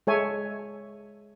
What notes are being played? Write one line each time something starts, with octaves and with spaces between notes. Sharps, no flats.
G#3 A4 C#5 E5 G#5